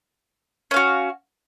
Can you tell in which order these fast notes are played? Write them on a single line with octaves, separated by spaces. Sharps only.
C#4 F5 F#4